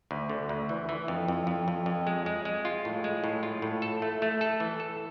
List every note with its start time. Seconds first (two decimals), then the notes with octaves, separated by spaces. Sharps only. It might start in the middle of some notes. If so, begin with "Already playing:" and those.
0.11 D2
0.29 D3
0.49 D2
0.69 E3
0.89 E3
1.08 F2
1.28 F2
1.47 F2
1.68 F2
1.86 F2
2.07 G#3
2.26 G#3
2.45 G#3
2.65 F4
2.85 A2
3.04 G#3
3.24 A2
3.43 F4
3.62 A2
3.82 A4
4.02 A3
4.22 A3
4.41 A4
4.60 E3
4.80 A4